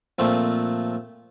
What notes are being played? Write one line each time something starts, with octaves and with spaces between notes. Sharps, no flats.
A#2 F3 A3 C4 F4